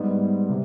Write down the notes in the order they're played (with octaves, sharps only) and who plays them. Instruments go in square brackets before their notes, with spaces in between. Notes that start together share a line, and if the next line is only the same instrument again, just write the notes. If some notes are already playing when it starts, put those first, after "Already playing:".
Already playing: [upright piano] G#2 G3 B3
C3